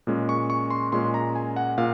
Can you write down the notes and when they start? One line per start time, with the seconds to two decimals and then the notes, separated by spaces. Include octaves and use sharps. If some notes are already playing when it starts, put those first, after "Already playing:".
0.07 A#2 G#3 C#4
0.29 C#6
0.50 C#6
0.70 C6
0.92 A#2 G#3 C#4 C6
1.14 A#5
1.35 G#5
1.56 F#5
1.78 A#2 F5